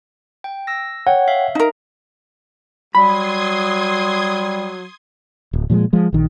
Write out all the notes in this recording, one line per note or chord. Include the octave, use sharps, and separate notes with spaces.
G5
E6 A#6
C#5 F#5 G5
E5 F5
D#4 A#4
F#3 G3 B5 C6 D#6 G#6
D1
A#2 F3 F#3 G#3
F3 G#3
A#1 D#3